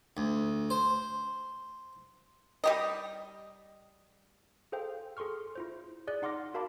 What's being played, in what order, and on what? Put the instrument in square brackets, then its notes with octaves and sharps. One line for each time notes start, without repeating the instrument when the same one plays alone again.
[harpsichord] D2
C5
[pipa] G3 G4 D#5
[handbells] G#4 A4 C5 F5 G5
G#4 A4 C6 C#6 F6
E4 F4 C5
G#4 D5 F#6
D#4 F#5 C6 D6 F6 A#6
F#4 A#4 F5 A5 B5 D6